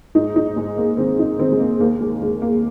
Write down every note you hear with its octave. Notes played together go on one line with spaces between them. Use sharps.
G#2 D#4
D#4
G#2 G#3
A#3
D#3 C4
D#4
D#3 C4
G#3
A#3
D#2 A#3
G#3
D#2 G#3
A#3